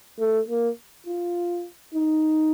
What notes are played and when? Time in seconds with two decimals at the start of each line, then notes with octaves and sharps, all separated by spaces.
0.19 A3
0.48 A#3
1.06 F4
1.94 D#4